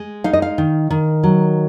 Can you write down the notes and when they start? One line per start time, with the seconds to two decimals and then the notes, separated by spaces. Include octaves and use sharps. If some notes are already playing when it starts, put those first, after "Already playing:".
Already playing: G#3
0.24 D#4 F5
0.33 D#5
0.42 F5
0.58 D#3
0.90 D#3
1.24 F#3